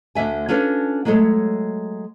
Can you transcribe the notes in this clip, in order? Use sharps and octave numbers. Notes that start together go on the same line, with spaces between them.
D2 D3 E5 G#5
C#4 D4 F4 A4 B4 C#5
F#3 G#3 A3 A4 C#5